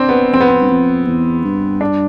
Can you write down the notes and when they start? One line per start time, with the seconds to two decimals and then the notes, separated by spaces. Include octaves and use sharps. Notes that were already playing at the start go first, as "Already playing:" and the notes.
Already playing: C4 D4
0.09 B3
0.33 F2 C4
0.41 B3
0.48 C4
0.61 G2
0.70 F2
1.07 E2
1.44 G2
1.81 D4